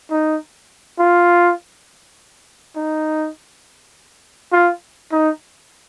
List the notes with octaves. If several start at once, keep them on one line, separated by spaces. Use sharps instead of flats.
D#4
F4
D#4
F4
D#4